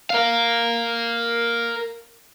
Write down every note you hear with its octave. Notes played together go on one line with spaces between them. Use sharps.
A#4 F5